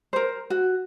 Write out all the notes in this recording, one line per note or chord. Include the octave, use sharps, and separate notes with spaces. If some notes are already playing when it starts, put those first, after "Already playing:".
A#4 C5
F#4